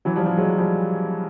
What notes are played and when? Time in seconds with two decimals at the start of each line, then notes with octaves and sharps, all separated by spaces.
0.05 E3 F#3
0.15 F3 G3
0.26 F3 G3
0.37 F#3 G#3
0.58 F3 G3